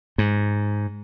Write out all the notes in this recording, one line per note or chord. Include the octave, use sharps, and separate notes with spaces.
G#2